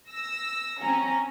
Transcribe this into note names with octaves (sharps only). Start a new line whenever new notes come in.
E6 A#6
C4 C#4 A#5